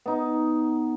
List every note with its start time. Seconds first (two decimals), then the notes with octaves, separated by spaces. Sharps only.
0.06 B3 D#4